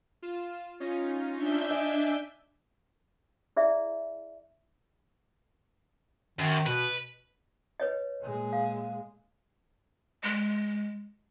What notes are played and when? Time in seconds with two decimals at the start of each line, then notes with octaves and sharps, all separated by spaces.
0.22 F4 E7
0.80 C#4 D#4 F4
1.36 D4 E5 G6
1.71 D#5 G#5 D6
3.56 E4 G#4 D5 E5
6.39 F#2 D#3
6.67 B2 B4
7.80 B4 C#5 D#5
8.21 A#2 G#3
8.53 F5
10.23 G#3